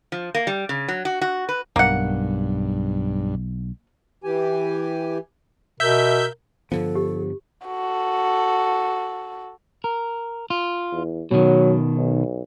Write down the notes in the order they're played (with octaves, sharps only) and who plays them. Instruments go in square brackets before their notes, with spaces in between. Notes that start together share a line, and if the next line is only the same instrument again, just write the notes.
[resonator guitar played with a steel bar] F3
A#3
G3
C#3
F#3
F#4
F#4
B4
[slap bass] B1 [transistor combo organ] G2 [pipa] A#3 F#5
[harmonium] E3 G4 G#5
[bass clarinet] B2 [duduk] A#4 [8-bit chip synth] E5 G6
[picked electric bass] G2 D3 B3 [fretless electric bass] F3 [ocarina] A4
[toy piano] G4
[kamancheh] F#4 A4
[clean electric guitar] A#4
F4
[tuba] E2
[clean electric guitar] B2 D#3 [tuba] F#3
[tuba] B1